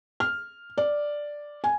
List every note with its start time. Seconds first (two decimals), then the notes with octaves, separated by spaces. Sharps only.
0.20 F6
0.78 D5
1.64 G#5